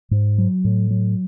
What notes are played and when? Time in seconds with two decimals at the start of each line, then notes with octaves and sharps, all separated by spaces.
0.11 G#2
0.38 F#3
0.64 A2
0.91 F#3